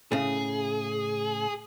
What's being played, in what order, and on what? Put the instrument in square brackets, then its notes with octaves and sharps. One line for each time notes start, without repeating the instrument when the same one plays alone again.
[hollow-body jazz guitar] A2 C#3 [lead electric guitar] G#4